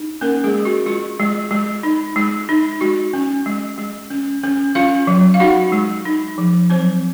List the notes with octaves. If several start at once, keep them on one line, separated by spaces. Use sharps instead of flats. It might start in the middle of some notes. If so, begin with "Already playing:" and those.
Already playing: D#4
A#3 C#4 A#4
G#3 G#4
G#3
F#4
G#3 F4
G#3
G#3
D#4
G#3
D#4
G#3 F#4
C#4
G#3
G#3
C#4
C#4
C#4 F4 F5
F#3
F5
D#4 F#4 F#5
G#3
D#4
F3
F#3 C4 C5